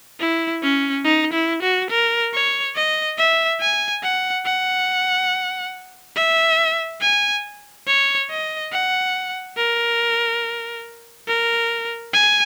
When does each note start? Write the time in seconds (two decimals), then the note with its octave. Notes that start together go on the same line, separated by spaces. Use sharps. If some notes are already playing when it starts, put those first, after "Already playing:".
0.20 E4
0.63 C#4
1.05 D#4
1.33 E4
1.63 F#4
1.90 A#4
2.34 C#5
2.75 D#5
3.18 E5
3.61 G#5
4.03 F#5
4.46 F#5
6.17 E5
7.01 G#5
7.87 C#5
8.30 D#5
8.73 F#5
9.57 A#4
11.28 A#4
12.14 G#5